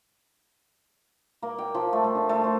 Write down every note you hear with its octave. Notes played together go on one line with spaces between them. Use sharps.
A#3
G5
F3
A3
A3
D4
A3
C5